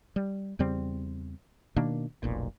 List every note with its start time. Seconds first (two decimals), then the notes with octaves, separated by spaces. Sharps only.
0.16 G3
0.59 E2 C#3 G3 C4
1.76 B2 D#3 A#3 D4
2.23 F1 B1 A#2